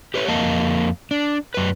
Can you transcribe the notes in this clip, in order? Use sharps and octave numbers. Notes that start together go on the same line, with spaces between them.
G4 B4 C#5
F2 A#3 D#5 F5 A5
D4
F#2 B4